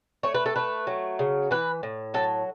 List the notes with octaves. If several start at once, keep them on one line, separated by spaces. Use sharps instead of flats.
A3 C#5
B4
A4
A3 B4
F#3
C#3
E3 B4
A2
F#3 A4